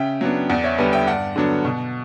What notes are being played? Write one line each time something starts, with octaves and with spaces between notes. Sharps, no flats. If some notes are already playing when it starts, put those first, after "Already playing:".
Already playing: C#3 E5 G5
F#3 B3 D4
E2 D5 F#5
C#5 E5
D3 G3 B3 B4 D5
E5 G5
G2 D5 F#5
D3 F#3 B3 D4
B2